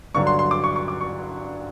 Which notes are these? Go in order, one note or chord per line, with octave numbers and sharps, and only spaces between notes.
G2 D3 F#3 C#6
C6
C6
D6
C#6
C#6
D6
C#6